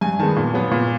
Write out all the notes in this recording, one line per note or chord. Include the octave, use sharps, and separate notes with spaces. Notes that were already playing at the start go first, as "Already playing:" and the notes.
G2 G#5
D#3 G#3 B3 A5
A#2
F#3 B3
A#2